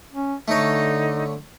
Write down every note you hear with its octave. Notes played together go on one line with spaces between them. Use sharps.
C#4
D3 A3 D#4 C#5